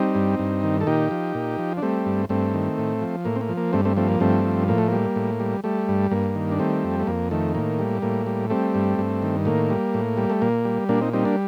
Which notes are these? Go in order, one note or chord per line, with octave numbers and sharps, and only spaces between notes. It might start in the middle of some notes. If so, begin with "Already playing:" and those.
Already playing: G3 C4 D#4
G2
G2
D#3
A4
A#2 D#4 G4
F3
A#2
F3
D4
G3 A3 C4
G2
G2 A3 C4
D#3
A2
F3
A2 A#3
C4
A#3
F3
A#3
G2 A3 C4
A3 C4
F3 A3 C4
A#3
G2 A3 C4
F3
A2 A#3
A3
G3 A#3
A2
G3
G3 A3
G2
G2 A#3
D#3
D4
G3 A3 C4
F2
A3
F2 A#3
D#3 A3
A2 A#3
G3
A2 A#3
G3
G3 A3 C4
G2
G2
D#3
A2 A#3
G3
A2
G3
A3
A#2 A#3
G3
A#2 A#3 D4
C4 D#4
G3 C4 D#4
A#3 D4